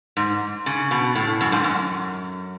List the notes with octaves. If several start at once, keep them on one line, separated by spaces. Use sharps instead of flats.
G#2
C#3
B2
A2
F#2
G#2
F#2